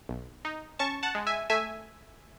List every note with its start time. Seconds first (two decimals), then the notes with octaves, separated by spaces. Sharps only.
0.09 B1
0.45 D#4
0.79 C#4 A5 C#6
1.03 F#5 A5
1.15 G#3
1.27 E5 G#5
1.50 A3 E5 G#5